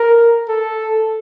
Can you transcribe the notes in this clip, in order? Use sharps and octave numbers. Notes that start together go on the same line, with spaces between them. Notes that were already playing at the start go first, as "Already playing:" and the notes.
Already playing: A#4
A4